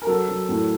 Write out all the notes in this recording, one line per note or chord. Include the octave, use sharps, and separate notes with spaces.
A#4
F#3 A4
F#3
A2